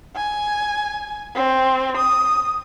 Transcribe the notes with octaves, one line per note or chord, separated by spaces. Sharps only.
G#5
C4
D#6